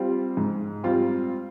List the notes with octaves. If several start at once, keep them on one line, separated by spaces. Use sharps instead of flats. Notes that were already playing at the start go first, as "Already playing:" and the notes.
Already playing: G3 C4 F4
G#2
G3 C4 F4